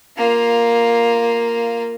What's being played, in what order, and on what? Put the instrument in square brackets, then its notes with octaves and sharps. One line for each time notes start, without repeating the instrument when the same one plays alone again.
[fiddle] A#3 F4